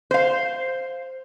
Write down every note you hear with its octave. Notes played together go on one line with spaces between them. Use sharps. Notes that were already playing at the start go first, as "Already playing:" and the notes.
C5 F5